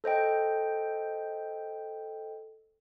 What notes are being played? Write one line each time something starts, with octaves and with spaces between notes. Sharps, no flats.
A4 C5 D#5 G5